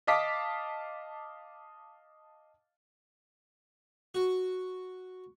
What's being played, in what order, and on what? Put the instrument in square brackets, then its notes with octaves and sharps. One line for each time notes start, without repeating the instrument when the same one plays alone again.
[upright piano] D#5 F5 A5 D6 B6
[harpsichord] F#4